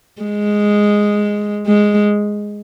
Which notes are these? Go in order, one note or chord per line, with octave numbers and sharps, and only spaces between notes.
G#3
G#3